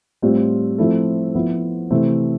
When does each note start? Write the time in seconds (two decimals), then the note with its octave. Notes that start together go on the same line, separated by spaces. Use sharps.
0.22 A2 G3 C4 F4
0.78 F3 A3 C4 E4 A4
1.35 F3 B3 E4
1.90 C3 E3 A3 C4 E4